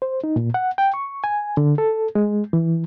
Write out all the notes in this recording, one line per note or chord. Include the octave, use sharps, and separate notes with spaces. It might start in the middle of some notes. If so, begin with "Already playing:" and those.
C5
D#4
A#2
F#5
G5
C#6
G#5
D3
A4
G#3
E3